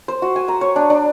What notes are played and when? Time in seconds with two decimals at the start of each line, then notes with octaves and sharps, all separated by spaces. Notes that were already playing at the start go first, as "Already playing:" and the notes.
0.08 C5
0.22 F#4
0.36 G#5
0.48 A#5
0.61 C#5
0.76 D4
0.90 D4